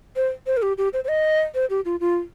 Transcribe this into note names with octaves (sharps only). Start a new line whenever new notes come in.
C5
C5
A#4
G4
G4
C5
C5
D#5
C5
G4
F4
F4